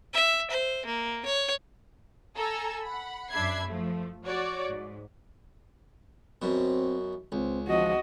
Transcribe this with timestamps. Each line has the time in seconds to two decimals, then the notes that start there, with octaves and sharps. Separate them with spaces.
0.13 E5
0.51 C5
0.85 A#3
1.26 C#5
2.36 A4 G#5 A#5 E6
2.84 F#5 B5
3.32 F#2 D4 E5 B5 G#6 C7
3.66 F3 A3
4.25 F#4 C#5 D5
4.70 G#2
6.42 F#2 B2 C4
7.32 C#2 C4
7.68 F3 F#4 D#5